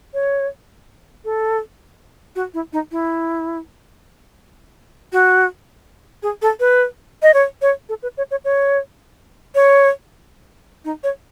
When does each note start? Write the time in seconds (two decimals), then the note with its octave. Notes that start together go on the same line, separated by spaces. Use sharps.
0.14 C#5
1.25 A4
2.36 F#4
2.54 E4
2.73 D#4
2.92 E4
5.13 F#4
6.23 G#4
6.42 A4
6.60 B4
7.22 D#5
7.34 C#5
7.62 C#5
7.89 A4
8.03 B4
8.18 C#5
8.31 C#5
8.45 C#5
9.55 C#5
10.85 D#4
11.04 C#5